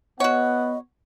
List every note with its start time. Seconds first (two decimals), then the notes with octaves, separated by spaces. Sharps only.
0.20 B3 F#4 C#5 D#5 F#5